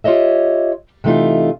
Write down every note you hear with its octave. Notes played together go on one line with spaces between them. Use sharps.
F4 G4 C#5 D#5 E5
C3 E3 A3 D#4 F4